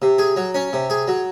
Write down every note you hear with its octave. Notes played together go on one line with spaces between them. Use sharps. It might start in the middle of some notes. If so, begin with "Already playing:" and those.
C3
G#4
F#3
C#4
C3
G#4
F#3